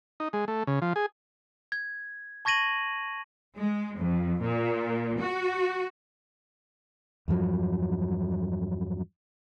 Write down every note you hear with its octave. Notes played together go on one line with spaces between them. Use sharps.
D#4
G#3
A3
C#3
F3
G#4
G#6
A5 C#6 G#6 A#6 D#7 F#7
G#3
F2
A#2
F#4
E2 G2 F3 F#3